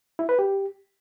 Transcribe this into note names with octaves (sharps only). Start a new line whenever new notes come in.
E4
B4
G4